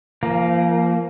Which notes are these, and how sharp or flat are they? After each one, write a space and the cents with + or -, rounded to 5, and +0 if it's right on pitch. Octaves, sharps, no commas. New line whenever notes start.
F3 -30 A#3 +0